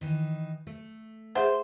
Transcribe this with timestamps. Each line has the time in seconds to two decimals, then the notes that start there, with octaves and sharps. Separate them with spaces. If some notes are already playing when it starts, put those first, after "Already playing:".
0.01 D#3 E3 D#4
0.67 A3
1.35 G#4 C5 E5 F#5